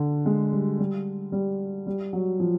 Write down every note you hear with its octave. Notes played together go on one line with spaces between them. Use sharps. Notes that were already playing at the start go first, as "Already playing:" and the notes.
Already playing: D3
G#3
G3
G3
G3
G3
F#3
F3